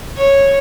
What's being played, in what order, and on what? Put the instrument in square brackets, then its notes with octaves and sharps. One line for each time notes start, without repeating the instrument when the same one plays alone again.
[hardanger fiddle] C#5